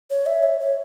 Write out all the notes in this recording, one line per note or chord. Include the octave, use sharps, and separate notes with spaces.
C#5
E5
C#5
C#5